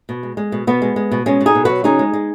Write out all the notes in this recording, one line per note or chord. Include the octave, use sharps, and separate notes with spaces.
B2
G#3
G#3
B2
B2 B3
G#3
G#3
B2
B2 G#3 C#4
B2
D#4 G#4
B2
F#3 F#4 B4
C#3 D#4 G#4
G#3
G#3